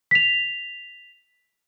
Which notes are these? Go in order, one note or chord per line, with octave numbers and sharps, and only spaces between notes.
B6 F7